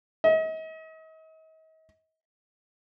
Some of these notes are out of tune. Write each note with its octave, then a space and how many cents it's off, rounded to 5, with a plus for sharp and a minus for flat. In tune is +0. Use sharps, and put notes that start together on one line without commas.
D#5 +40